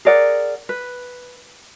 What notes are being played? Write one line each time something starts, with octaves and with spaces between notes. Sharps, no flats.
G#4 A#4 D5 F#5
B4